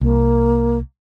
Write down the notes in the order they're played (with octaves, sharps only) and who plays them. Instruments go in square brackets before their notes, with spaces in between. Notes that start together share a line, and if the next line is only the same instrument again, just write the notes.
[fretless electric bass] C2 [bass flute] A#3